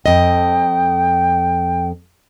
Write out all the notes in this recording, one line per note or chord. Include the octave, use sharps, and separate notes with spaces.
F2 D#5 G5